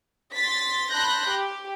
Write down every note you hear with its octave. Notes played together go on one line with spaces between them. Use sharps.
C6 A6 B6
A5 B5 C6 F#6 G6 A#6
G4